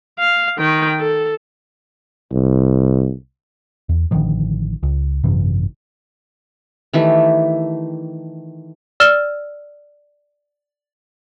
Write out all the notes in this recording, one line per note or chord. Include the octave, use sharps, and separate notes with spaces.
F5
D#3 G5
A4
C2
E2
A1 D3 D#3 F3
C#2
G#1 F#2 C3 E3
D#3 E3 A3 G4
D5 E6 F6 E7 G7